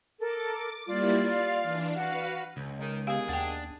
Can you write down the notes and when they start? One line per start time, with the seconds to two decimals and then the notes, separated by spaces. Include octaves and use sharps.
0.19 A4 A#4 D6
0.86 G3 A#3 E4 F4 D5
1.23 F5
1.62 E3 D4
1.94 F#4 B4 F5
2.57 C#2
2.79 D#3 G#3
3.07 G#2 D#3 B3 G4 G#4 F5
3.29 D#2 D4 F#5 G5